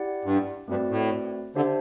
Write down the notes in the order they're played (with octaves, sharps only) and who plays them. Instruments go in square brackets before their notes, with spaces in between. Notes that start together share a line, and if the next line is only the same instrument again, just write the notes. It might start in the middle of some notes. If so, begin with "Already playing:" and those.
Already playing: [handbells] E4 G4 D5 F#5
[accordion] G2
[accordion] G2 [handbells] A3 C4 F#4 B4 D5
[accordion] A2
[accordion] D3 [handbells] D4 G4 C5 E5 A5